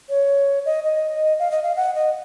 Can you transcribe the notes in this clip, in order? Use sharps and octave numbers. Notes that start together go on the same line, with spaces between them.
C#5
D#5
D#5
F5
D#5
F5
F#5
D#5